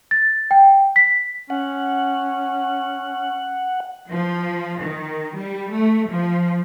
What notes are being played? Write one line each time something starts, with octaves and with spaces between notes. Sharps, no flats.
A6
G5
B6
C#4 F#5
F3
D#3
G3
A3
F3